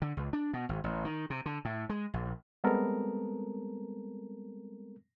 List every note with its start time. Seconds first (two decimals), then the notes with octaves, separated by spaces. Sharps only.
0.02 D3
0.17 C#2
0.33 D4
0.53 B2
0.69 G#1
0.84 A1
1.05 D#3
1.30 C3
1.46 D3
1.65 A2
1.89 G#3
2.14 A#1
2.64 G3 G#3 B3 C4 A4 A#4